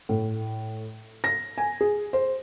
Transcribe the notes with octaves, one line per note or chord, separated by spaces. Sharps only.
A2
A#6
G#5
G#4
C5